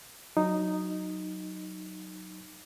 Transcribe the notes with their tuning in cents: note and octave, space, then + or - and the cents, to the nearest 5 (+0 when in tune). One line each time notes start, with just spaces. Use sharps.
F#3 +0 D#4 -5